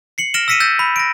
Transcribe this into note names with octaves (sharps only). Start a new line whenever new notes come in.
C7 C#7 F#7
F6 A#6 D7 E7 F#7 G7
E6 A#6 B6 C#7 D#7 E7
E6 G6 A6 A#6
B5
A#6 D7